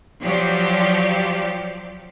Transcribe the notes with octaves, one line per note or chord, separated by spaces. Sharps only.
F3 F#3 G4 D5